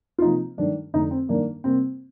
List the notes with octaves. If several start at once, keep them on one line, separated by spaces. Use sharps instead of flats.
F4
C3 F3 A#3 D#4
G2 D#3 A3 D4
F2 D3 A3 D#4
C4
G2 D#3 A#3 D4
C3 G3 A#3 C4